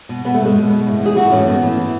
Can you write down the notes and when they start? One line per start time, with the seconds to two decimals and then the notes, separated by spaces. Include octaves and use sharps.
0.09 B2
0.25 B2 B3
0.34 A3
0.40 B2 G#3
0.56 B2
0.70 B2
0.86 A2
1.01 E3 G#4
1.17 E3 F#4
1.32 A2 C#4
1.47 A2 B3
1.63 E3
1.79 E3